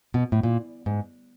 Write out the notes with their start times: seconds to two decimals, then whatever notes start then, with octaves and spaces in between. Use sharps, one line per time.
0.14 B2
0.32 A2
0.43 A#2
0.86 G#2